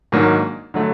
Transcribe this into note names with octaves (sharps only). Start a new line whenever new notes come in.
G#2 D#3 F#3 A#3 D4
D3 F#3 A3